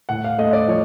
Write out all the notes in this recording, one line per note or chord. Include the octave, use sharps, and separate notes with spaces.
A2 F#5
F5
A3 D#5
D5
F3 C#5